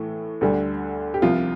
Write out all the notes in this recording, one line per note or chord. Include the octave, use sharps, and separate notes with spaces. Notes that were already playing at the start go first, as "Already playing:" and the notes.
Already playing: A2 E3 A3
D2 D3 G3
G4
C2 C3 F3 F4